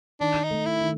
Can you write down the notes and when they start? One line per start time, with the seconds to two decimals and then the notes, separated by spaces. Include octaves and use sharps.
0.20 D#3 D4
0.43 D#4
0.50 A3
0.66 E4
0.81 D#3